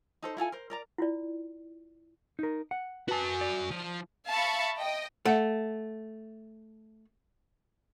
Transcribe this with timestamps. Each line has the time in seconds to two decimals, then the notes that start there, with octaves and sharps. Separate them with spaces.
0.23 D#4 A4 C5
0.37 E4 F4 A4 G#5
0.52 A#4 C5
0.70 A#4 D5 A#5
0.98 E4 F4 D5
2.39 D#4 A#4
2.71 F#5
3.08 F#4 B4 G#5 A5
3.41 D5
3.71 F3
4.29 E5 F5 A5 B5 C#6
4.78 D#5 G5
5.25 A3 E5 F#5